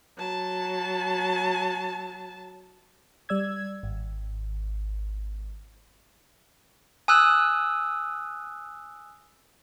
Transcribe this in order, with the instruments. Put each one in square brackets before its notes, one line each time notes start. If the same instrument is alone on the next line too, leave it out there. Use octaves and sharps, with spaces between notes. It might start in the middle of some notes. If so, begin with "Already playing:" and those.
[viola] F#3 A5
[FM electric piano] G3 D5 E6 G#6
G#1
[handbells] G#5 D#6 E6 F#6